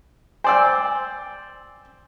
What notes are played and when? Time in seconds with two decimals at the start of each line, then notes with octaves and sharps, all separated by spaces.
0.44 C5 D5 G5 G#5 E6